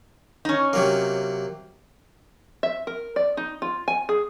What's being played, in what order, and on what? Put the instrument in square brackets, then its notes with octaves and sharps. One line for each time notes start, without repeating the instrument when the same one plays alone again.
[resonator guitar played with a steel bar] C#4 D#4
[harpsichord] C3 F#3 A#3
[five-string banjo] E5
A#4
D5
D#4
F4
G#5
G#4